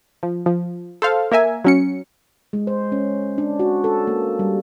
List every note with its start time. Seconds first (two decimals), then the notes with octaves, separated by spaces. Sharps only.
0.23 F3
0.46 F3
1.02 A4 C5 F5
1.32 A#3 A#4 E5 G#5
1.64 F#3 C#4 C#7
2.53 G#3
2.67 C5
2.92 C#4
3.38 D4
3.59 F#4
3.84 A4
4.07 A#3
4.39 G3